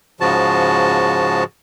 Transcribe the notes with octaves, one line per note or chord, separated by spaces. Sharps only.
G#2 C#3 F3 F#4 A5